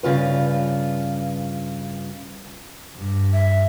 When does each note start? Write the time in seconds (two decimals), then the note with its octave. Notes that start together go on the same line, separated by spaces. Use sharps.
0.03 G2 C#3 F4 B4
2.97 G2
3.33 E5